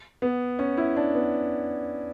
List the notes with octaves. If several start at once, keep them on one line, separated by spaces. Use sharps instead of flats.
B3
C#4
E4
D4
B3